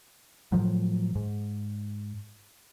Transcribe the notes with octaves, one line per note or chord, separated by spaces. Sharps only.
A2 F3 F#3
G#2